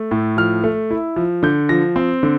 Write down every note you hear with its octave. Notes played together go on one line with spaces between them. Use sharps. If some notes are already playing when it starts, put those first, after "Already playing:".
Already playing: A3
A2
F3 F6
A3
E4
F3
D3 G6
F3 A#6
C4
D3